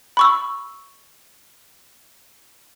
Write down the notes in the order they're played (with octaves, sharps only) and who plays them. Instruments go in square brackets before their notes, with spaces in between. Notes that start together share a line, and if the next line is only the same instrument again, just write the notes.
[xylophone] B5 C#6 E6